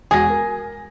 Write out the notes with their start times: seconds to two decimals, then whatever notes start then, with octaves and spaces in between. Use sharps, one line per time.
0.11 E1 F#4 G#4 A#6
0.30 A#4